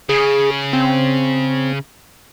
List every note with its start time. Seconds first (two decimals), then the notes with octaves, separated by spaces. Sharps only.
0.09 C#3 G#4
0.73 C4